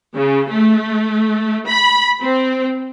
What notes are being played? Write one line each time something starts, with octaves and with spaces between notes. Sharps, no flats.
C#3
A3
B5
C4